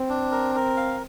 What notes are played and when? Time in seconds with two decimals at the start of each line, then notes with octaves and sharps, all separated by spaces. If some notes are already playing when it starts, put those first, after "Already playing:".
Already playing: C4
0.09 D4
0.32 A#4
0.55 A#4
0.77 F5